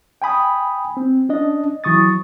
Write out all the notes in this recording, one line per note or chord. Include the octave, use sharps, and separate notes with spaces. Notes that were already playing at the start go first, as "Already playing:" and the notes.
G5 G#5 B5 D#6
C4
C#4 D4 D#5
E3 F#3 C#6 D#6 A6